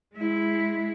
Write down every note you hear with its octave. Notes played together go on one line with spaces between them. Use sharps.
G#3 E4